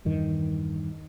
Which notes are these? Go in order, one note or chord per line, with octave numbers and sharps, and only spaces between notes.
E2 G2 D#3